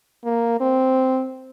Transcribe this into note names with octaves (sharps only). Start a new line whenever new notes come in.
A#3
C4